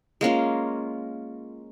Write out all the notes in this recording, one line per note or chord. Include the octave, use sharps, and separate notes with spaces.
G#3 A#3 C#4 F4